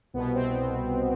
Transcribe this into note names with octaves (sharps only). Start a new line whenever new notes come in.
C2 B2 B3
C4